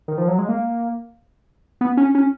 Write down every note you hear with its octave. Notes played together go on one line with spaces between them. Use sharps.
D#3
F3
F#3
G#3
A#3
B3
C#4
C#4